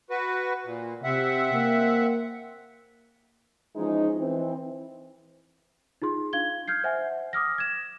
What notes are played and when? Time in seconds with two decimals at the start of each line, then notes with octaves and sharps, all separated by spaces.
0.10 F#4 B4
0.65 A#2
1.04 C3 C4 E5 F#5
1.54 A#3
3.76 E3 F3 G#3 C#4 D#4
4.18 E3 C4
6.02 D#4 F4 G#4 C6
6.33 D4 F5 G#6 G7
6.68 F6 G6 G#6 C7
6.84 C5 E5 F#5 G#5
7.33 D6 D#6 F6 A#6
7.58 G#6 E7